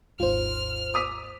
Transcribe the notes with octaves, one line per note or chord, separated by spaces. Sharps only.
G#1 D#2 G#2 F4 C5 F6
D6 D#6 B6